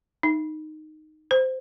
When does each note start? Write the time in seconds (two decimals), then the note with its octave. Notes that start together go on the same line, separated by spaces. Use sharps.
0.23 D#4
1.31 C5